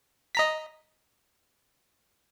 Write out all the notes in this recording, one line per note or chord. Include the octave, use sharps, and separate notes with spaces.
D#5 A#5 B6